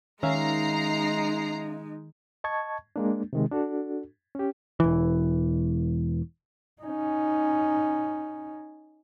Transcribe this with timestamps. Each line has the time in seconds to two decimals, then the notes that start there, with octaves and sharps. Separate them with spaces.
0.23 D#3 G#3 C#4 D#4 E5 F5 A#5 C7
2.44 D#5 A5 C#6 G#6
2.96 G#3 A#3 D4
3.33 C3 D#3 G#3
3.52 D4 F#4 A4
4.35 C#4 G4
4.80 E1 E3
6.82 C#4 D#4